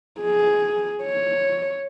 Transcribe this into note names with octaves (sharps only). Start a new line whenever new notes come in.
G#4
C#5